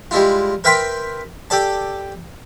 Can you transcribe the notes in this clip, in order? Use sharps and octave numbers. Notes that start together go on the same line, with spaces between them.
G3 G#3 E4 F4
A#4 B4 E5 G5 B5 C6
G4 A4 D5 A5